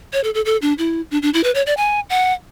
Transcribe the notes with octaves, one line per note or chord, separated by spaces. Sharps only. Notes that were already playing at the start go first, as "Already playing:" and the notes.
C#5
A4
A4
A4
D4
E4
D4
D4
E4
B4
C#5
D5
G#5
F#5